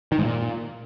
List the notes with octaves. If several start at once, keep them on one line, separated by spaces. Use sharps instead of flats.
D#3
G#2
A#2